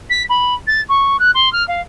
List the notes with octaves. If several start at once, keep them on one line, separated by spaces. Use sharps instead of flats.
B6
B5
A6
C#6
F#6
C6
F6
F5